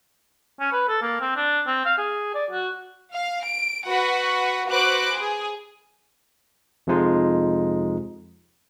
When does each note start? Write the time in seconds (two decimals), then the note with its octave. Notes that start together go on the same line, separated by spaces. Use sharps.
0.60 C#4
0.72 B4
0.88 A4
1.02 A#3
1.21 C4
1.36 D4
1.66 C4
1.85 F5
1.98 G#4
2.34 D5
2.50 F#4
3.13 F5
3.43 D7
3.88 F#4 B4 F#5
4.69 F#4 B4 C5 D6 F#6 D7
5.17 G#4
6.87 F2 C3 F3 G#3 D#4 F4